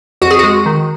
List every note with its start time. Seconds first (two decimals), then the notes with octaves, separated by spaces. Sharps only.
0.21 F2 F#4
0.31 G#4
0.39 G#3 F#4
0.66 D#3